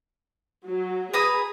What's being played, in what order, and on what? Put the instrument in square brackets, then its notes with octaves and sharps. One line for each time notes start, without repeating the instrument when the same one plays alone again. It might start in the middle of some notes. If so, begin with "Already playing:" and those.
[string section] F#3
[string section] G#4 [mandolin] B4 A#5 D#6